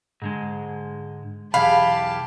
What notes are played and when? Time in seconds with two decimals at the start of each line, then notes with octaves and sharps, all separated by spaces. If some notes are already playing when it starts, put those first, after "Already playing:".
0.22 G#2 D3 G#3
1.54 B1 E2 G4 G#4 F5 A5 B5